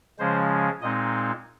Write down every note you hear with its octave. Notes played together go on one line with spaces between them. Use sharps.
C#3 F3 G#3 C#4 C5
A#2 G#3 C4 D#4 D#5